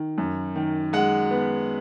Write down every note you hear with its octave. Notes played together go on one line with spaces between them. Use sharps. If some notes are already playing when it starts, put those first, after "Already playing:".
Already playing: D#3
F#2
D#3
G#3 F#5
B3